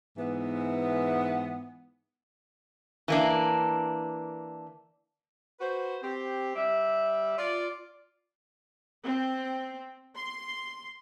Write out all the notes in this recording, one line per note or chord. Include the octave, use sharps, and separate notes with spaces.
G#2 E3 B3
E3 A#3 D4
F#4 B4 C5
C4 G4
G3 D5 E5
F4 D5
C4
C6